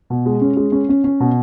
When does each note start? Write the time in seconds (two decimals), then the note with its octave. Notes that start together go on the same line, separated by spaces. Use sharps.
0.10 B2
0.26 G#3
0.41 C#4
0.57 G#3
0.72 C#4
0.89 C#4
1.04 C#4
1.20 B2